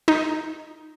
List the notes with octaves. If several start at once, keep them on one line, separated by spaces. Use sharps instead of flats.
D#4